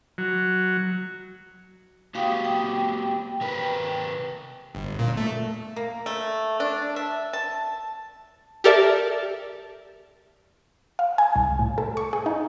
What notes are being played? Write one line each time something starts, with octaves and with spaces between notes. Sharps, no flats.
F#3
A#3 F#4 G4 F5 G5 D#6
G5
C3 A#4 B4
G1
A#2
A3
A#3
A3
D4
E5
A5
G4 A4 A#4 D5 E5 A5
F5
G#5
C2
A2
A4
C#6
G#4
D#4